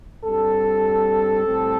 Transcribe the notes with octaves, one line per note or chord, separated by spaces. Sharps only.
G2 G3 C4 A4
A2 G3 C4